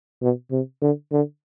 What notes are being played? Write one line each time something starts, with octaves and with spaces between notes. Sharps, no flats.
B2
C3
D3
D3